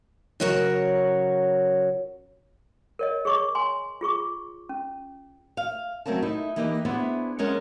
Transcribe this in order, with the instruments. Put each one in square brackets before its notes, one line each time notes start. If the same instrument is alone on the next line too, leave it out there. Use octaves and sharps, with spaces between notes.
[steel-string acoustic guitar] C#3 F#3 F#4 A#4 C#5
[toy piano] A#4 C#5 D#5
G#4 C#5 C#6 D6
G#5 C6
F4 G#4 C#6 D6
C#4
[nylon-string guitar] F5
F#3 A3 C4 C#4 A#4 A5
D#4 E4 A4
E3 A#3 D#4 G4 B4 D#5
B3 D4 E4 G#4 B4 C5
F2 G#3 C#4 A#4 F#5